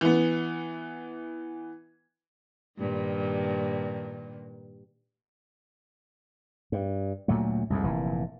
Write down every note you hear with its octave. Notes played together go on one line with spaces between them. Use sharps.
E3 B3
G2 A#2 D#3
G2
D2 A#2 F#3 A3
C2 F2 G#2
F1 A#2 E3